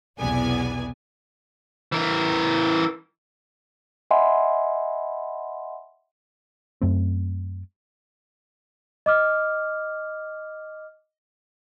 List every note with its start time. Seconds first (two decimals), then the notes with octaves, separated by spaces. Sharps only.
0.18 B1 E2 C3 B3 D5 G#5
1.92 E3 A#4
4.11 D#5 E5 F#5 G#5 B5 C6
6.81 F#2 A3 C4
9.06 D#5 D6 F6